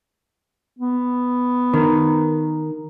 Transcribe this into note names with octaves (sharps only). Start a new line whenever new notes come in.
B3
D#3